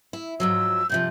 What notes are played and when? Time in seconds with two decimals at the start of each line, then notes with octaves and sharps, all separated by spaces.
0.13 E4
0.40 G#2 F3 F#3 E6
0.89 G2 C3 F3 G6